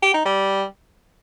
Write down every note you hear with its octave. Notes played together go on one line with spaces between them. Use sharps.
G4
D#4
G3